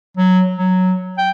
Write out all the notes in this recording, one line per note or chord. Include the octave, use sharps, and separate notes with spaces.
F#3
F#3
G5